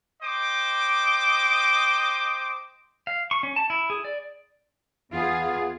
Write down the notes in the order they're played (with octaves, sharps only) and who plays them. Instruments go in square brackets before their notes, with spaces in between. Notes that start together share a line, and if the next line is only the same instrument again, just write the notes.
[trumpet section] C5 D#5 G5 D6
[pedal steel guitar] F5
C#6
C#4
A5
E4
G#4
D5
[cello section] E2 F4 G#4 [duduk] B3